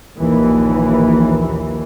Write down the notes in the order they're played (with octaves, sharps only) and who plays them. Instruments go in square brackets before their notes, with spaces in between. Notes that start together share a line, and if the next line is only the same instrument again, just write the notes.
[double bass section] A#1 D#2 E3